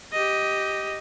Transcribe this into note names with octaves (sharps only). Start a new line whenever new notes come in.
G4 D#5